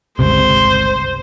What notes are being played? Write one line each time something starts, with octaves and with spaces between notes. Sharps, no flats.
G1 C#2 C3 C5